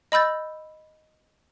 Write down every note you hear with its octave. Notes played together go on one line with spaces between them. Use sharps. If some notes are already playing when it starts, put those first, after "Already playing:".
D#5 B5 E6 G6 A6